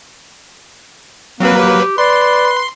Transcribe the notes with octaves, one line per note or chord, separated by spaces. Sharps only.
F#3 A#3 C4 B4
G4
B4 D5 C6